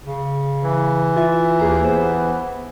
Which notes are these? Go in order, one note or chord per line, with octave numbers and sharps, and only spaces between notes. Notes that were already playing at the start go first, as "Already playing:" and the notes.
C#3
E3
F4 E5
D#2 G#4 A#5
B3 C5